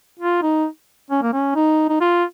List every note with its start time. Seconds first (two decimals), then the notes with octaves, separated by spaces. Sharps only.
0.19 F4
0.42 D#4
1.10 C#4
1.22 A#3
1.33 C#4
1.55 D#4
1.89 D#4
2.01 F4